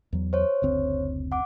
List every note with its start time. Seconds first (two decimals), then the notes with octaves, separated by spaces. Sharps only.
0.13 E2 F#3
0.33 C5 C#5
0.62 F#1 D2 C4
1.32 F#5 D6